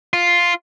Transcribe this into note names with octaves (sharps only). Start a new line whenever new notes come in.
F4